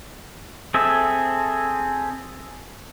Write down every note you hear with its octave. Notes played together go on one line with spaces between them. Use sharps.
C4 G#4 A4 E5